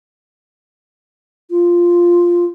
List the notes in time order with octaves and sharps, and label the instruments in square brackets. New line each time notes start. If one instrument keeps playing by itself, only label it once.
[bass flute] F4